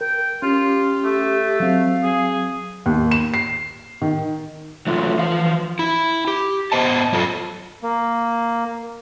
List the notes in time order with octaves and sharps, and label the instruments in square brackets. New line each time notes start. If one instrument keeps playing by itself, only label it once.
[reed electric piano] A#4 [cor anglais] G5
[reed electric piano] C#4 [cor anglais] F4 [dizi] G4
[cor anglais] A3
[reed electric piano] F#3 C4 [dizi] F5
[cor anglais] G#4
[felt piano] D#2
E7
C7
D#3
[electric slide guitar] F#3 A3 F4
E3 F3 F5
E4
G4
B3 C5 D#5 A5
F#3 F4 A4 C5 C#5
[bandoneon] A#3